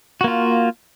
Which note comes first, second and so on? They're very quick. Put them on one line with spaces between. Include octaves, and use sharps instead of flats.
F#4 A#3 F4